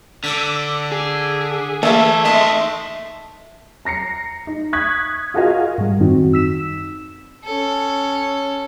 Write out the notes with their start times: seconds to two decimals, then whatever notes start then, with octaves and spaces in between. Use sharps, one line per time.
0.24 D3 D6 E6 B6
0.92 G#4
1.83 E3 A3 A#3 E5
2.25 D#4 D#5 E5 A5 C6
3.85 A#5 A#6 C7 C#7
4.47 D#4
4.73 C#6 D#6 F#6 G#6 B6
5.34 F4 F#4 G#4 A#4 D#5 F5
5.78 G#2 G3
6.00 F#2 D#3 C4 D#4 F#4
6.33 E6 B6 E7
7.44 C#4 A4